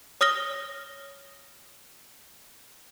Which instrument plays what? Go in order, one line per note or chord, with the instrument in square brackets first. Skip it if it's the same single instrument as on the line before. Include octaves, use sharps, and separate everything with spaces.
[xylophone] C#5 D#6 F6 A#6 G7